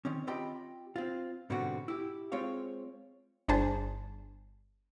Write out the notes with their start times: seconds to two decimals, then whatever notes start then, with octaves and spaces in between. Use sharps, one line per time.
0.05 D#3 C4 C#4
0.27 C4 F4 G4 D#5 G5 B5
0.96 C4 F4
1.50 G#2 B2 D3 G3 C4 F#4
1.88 E4 G4
2.32 G#3 C4 F4 C#5 F5
3.48 G1 D4 G#4 C5 A5